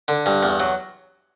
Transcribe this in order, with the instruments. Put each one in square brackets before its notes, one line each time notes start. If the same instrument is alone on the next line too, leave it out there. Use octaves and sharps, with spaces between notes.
[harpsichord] D3
G2
E2
F#3